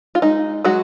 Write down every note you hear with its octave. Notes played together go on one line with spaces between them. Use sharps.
F4
G#3 D#4
F#3 G#3 F#4